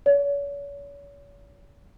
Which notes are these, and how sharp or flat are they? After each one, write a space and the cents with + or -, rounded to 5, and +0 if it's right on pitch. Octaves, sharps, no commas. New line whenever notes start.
C#5 +40